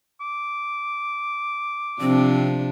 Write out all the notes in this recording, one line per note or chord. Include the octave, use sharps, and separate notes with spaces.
D6
C3 F3 C4 D4